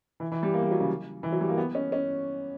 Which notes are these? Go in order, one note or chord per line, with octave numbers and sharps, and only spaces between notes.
E3
E3
G3
A#3
G3
F#3
C#3
E3
F#3
G3
A#3
B3
C#4
C#4